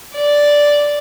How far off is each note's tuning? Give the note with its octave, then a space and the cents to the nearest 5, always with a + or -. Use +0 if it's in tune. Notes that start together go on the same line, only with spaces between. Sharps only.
D5 -5